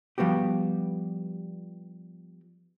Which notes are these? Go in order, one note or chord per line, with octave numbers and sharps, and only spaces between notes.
F3 G3 B3 F#4 G4